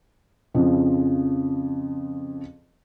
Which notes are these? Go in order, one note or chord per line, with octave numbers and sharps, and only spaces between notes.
F2 C#3 F3